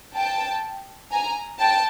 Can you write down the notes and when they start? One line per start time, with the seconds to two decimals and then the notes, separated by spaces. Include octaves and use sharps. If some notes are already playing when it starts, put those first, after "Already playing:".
0.15 G5 A5
1.11 G#5 A#5
1.60 G5 A5